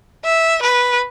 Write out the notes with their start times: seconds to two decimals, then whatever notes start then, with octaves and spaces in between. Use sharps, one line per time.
0.25 E5
0.62 B4